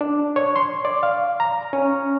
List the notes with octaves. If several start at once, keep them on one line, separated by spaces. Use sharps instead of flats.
D4
C#5
C6
D5
F5
A#5
C#4